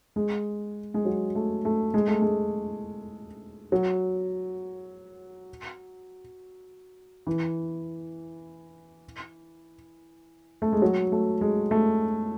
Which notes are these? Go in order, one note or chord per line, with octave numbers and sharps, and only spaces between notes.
G#3
G#3
F#3
A3
A3
G#3
A3
G#3
F#3
E3
A3
G#3
F#3
A3
G#3
A3